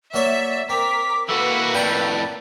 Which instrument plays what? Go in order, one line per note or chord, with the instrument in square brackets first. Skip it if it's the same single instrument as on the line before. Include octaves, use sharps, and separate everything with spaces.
[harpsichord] F#3 A#3 C#5 [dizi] D5 [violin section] E5
[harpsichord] C4 [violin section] A#4 B6 [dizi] D6
[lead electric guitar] E3 F#4 [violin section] A#3 B4 [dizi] A4
[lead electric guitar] F2 A2 [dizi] D5 [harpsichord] G5 A#5 C#6